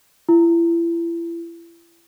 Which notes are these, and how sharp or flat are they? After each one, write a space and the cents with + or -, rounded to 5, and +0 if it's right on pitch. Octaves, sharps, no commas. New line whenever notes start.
E4 +35